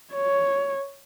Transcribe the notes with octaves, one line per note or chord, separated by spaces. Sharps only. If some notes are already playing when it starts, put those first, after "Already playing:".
C#5